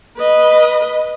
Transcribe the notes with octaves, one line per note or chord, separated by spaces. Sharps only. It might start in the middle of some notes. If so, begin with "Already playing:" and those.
B4 D#5